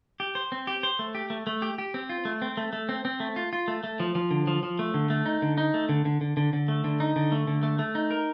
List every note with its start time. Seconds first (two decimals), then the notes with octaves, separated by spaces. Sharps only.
0.20 G4
0.35 C5
0.52 C4
0.67 G4
0.83 C5
0.99 A3
1.15 G4
1.30 A3
1.47 A3
1.62 G4
1.78 G4
1.94 C4
2.10 F4
2.25 A3
2.42 C4
2.57 A3
2.73 A3
2.89 C4
3.05 C4
3.20 A3
3.36 F4
3.53 F4
3.68 A3
3.84 A3
4.00 F3
4.15 F3
4.31 D3
4.47 F3
4.63 F3
4.79 A3
4.94 D3
5.10 A3
5.26 D#4
5.42 D3
5.58 D#4
5.74 A3
5.89 D3
6.05 D3
6.21 D3
6.37 D3
6.53 D3
6.68 A3
6.84 D3
7.00 D#4
7.16 D3
7.32 A3
7.47 D3
7.63 A3
7.79 A3
7.95 D#4
8.11 A#4